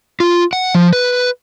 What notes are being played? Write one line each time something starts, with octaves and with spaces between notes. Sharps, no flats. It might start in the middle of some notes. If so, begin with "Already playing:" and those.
F4
F#5
F3
B4